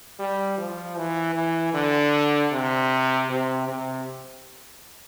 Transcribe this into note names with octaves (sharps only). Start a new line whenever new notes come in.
G3
F3
E3
E3
D3
C3
C3
C3